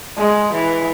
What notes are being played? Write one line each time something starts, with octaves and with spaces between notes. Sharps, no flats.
G#3
E3